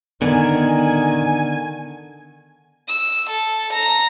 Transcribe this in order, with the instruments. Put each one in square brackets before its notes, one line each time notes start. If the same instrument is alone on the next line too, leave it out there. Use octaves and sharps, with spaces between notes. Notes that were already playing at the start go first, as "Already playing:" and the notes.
[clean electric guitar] D3 [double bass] D#3 [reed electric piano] B3 [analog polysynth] G#5
[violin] E6
A4
A#5